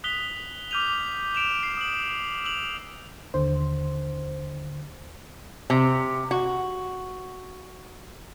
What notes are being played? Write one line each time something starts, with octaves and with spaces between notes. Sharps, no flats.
D#6 F#6 B6 F7 G7
D6 F6 G6 D#7 F7
D7 E7 F7
C7
D#6 F#7
E6 F7 F#7
D#2 D3 C5
C3
F#4